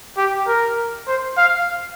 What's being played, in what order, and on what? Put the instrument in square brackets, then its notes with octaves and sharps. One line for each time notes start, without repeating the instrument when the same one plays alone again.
[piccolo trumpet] G4
A#4
C5
F5